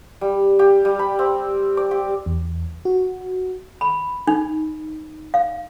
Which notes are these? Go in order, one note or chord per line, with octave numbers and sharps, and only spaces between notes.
G3
G4
G3
B5
C4
D5
G4
E2
F#4
B5
D#4
F5